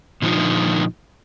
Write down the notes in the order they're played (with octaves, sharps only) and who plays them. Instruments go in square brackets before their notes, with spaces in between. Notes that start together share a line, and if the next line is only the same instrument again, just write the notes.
[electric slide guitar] A#2 D3 F3 A3 D#4 F4